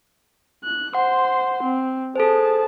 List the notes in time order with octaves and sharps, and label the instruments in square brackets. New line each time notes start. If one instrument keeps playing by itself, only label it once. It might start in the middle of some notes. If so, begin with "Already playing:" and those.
[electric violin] F#6
[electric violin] C5 C6 [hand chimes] F#5
[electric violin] C4
[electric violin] G#4 A5 [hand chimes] A4 C5